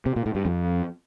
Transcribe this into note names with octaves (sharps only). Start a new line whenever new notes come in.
C3
A#2
A2
G2
F2